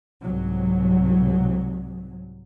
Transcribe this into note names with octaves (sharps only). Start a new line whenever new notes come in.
C2 G#2 F#3